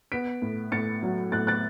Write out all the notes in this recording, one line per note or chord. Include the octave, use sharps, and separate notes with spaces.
B3 B6 D7
A2
A2 A6 C#7
F#3
A2 F#6 A6
F#6 A6